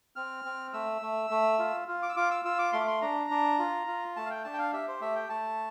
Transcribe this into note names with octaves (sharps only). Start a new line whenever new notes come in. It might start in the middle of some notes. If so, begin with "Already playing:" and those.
C4 F6
C4
A3 E6
A3
A3
F4
F4
D6
E6
F4 D6
E6
F4 E6
D6
A3 C6
D6
C6
D4 A#5
D4
F4
F4
A3 A5
F5
G5
D4 A5
G5
F5
G4 E5
C5
A3 E5
G5
A3 A5